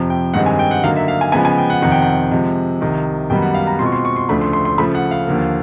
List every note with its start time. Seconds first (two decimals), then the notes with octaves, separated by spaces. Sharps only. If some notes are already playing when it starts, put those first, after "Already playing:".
Already playing: F2 C3 F3
0.10 G5
0.34 G2 D#3 G#3 C4 F#5
0.46 G#5
0.59 G5
0.71 F#5
0.83 D3 F#3 A#3 D#4 F5
0.96 E5
1.08 F5
1.21 G#5
1.32 C#3 F3 G#3 B3 G#5
1.45 G#5
1.58 G5
1.70 F#5
1.82 F2 C3 D#3 F#5
1.92 G5
2.02 F#5
2.31 C3 F3 G#3
2.81 C2 C3 D#3
3.30 F#2 D#3 G3 B3 D#4 G5
3.42 F#5
3.54 F5
3.67 A#5
3.79 B2 G#3 C4 F4 C6
3.86 C#6
3.92 C6
4.05 C#6
4.16 C6
4.29 D2 C#3 F3 A3 D4 B5
4.41 C6
4.53 C6
4.65 C6
4.78 C#3 F3 A3 B5
4.95 F#5
5.11 F5
5.27 D#2 D3 F3 A#3